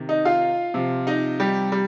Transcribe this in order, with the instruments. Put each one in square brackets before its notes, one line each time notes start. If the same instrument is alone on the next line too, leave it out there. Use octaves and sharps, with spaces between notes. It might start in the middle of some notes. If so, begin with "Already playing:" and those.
Already playing: [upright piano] C3 D#3
D#4 D#5
F4 F5
C3 F3
D#4 D#5
G3 G4
G3